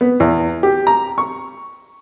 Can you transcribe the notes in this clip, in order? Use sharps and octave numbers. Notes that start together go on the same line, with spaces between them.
B3
E2
G4
A#5
C#6